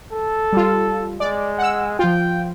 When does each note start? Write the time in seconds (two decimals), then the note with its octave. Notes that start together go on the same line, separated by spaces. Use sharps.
0.13 A4
0.53 G3 F4
1.20 G#3 D5
1.58 F#5 E6
1.99 F3 F4 G5